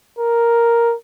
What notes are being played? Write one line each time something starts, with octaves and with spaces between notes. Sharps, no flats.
A#4